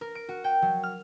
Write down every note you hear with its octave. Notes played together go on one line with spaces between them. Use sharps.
A#4
D7
F#4
G5
F#3
F6